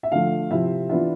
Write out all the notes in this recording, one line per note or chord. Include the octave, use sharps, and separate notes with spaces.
E5
D3 F3 A3 F5
C3 F3 C4 E4 E5
E3 B3 D4 F4 E5